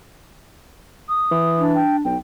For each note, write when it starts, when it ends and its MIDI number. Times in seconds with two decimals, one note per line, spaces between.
1.09 1.62 87
1.31 1.82 52
1.58 2.05 62
1.75 1.97 79
2.05 2.16 35
2.05 2.17 79